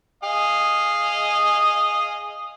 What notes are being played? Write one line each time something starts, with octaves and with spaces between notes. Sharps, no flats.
G#4 D#5 F5